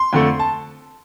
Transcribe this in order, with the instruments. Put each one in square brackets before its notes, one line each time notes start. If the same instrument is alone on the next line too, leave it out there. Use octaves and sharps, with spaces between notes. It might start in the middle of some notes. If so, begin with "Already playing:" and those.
Already playing: [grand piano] C6
F2 D3 A3
A5